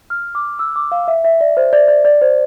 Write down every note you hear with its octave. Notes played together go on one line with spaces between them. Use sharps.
F6
D6
E6
D6
F5
E5
E5
D5
C5
D5
D5
D5
C5